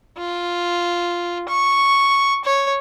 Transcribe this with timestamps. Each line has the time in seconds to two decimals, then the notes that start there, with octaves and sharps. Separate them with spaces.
0.18 F4
1.49 C#6
2.45 C#5